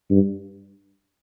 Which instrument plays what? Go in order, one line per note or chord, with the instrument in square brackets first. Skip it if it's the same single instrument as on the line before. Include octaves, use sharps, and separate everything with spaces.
[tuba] G2